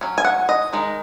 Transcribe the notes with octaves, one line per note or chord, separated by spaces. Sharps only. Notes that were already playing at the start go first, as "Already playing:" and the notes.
F#3 C#4
G#5
F#5
D#5
D#3 G#3 D#4